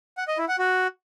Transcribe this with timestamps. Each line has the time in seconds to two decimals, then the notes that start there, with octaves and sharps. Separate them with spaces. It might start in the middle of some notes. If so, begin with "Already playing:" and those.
0.17 F#5
0.28 D#5
0.38 E4
0.48 F#5
0.59 F#4